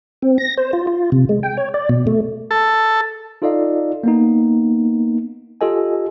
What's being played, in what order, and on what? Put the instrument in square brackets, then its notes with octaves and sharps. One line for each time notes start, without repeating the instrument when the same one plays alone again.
[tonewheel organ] C4
A#6
C5
F4
F4
C3
G#3
G5
C#5
D5
B2
A3
[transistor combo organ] A4
[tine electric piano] D#4 F4 A4 D5 D#5 F5
A#3 B3 D#4
F4 G4 A4 D#5 G#5